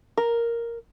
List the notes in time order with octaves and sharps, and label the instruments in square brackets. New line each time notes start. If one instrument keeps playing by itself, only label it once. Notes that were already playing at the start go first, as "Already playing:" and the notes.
[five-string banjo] A#4